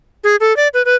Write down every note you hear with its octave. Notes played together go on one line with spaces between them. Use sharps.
G#4
A4
D5
B4
B4